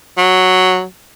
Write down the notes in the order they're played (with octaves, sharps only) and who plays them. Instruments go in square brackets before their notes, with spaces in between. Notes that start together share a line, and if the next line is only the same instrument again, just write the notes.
[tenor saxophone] F#3